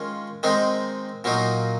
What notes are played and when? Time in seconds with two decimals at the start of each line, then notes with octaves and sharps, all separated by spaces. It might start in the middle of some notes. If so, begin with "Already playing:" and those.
Already playing: D#3 G#3 C#4 F4
0.43 D#3 G#3 C4 D#4
1.24 A#2 F#3 A#3 D#4